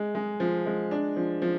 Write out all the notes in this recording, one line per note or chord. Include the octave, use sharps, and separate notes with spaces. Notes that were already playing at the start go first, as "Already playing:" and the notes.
Already playing: G#3
G#3
F3
G#3
D4
F3
F3